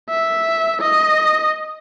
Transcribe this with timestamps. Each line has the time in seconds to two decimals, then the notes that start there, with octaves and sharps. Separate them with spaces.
0.10 E5
0.81 D#5